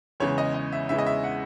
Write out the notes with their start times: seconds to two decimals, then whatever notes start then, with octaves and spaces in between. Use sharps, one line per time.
0.20 E2 C#3 E3 G#3 C#5
0.38 D#5
0.54 D#5
0.72 E5
0.89 E2 C#3 E3 G#3 E5
0.98 D#5
1.06 E5
1.24 F#5